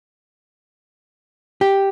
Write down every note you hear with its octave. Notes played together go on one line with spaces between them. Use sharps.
G4